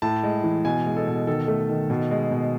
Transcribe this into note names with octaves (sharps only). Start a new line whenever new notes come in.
A2 A5
G#3
E3
B2 G#5
G#3
A4
B2
D#3 A4
A3
D#3
B2
G#3
B2